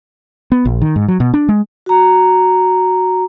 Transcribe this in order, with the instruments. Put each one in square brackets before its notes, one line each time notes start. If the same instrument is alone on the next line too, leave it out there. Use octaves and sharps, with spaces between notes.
[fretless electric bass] B3
A#1
D#3
G#2
F#3
B2
D4
G#3
[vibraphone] F#4 A#5